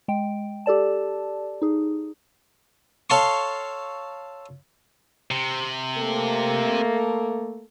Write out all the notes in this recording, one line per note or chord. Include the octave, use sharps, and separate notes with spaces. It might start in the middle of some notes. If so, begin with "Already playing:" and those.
G#3 G5
G4 A4 D5 A5
D#4 G#4
A4 C#5 F5 A5 C6 C#6
C3
A3 A#3 A4